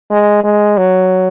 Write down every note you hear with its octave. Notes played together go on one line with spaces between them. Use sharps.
G#3
G#3
F#3